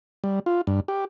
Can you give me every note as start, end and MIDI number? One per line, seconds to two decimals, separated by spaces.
0.24 0.39 55
0.46 0.61 65
0.67 0.80 43
0.88 1.05 67